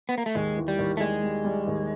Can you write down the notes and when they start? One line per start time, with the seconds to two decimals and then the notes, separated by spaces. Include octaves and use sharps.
0.09 B3
0.18 A#3
0.26 A3
0.35 D#2 G#3
0.56 E3
0.68 G3
0.79 D#2
0.97 A3
1.00 G3 G#3
1.23 G3
1.45 G3
1.67 D#2